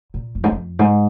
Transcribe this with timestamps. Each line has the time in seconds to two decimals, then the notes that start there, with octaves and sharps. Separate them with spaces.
0.14 A#2
0.35 F2
0.44 G#2
0.52 F2
0.79 G#2